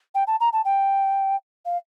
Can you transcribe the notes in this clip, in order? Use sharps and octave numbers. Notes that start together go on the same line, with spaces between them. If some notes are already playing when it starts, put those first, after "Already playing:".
G5
A5
A#5
A5
G5
F5